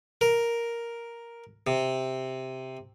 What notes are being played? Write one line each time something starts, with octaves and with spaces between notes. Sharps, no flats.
A#4
C3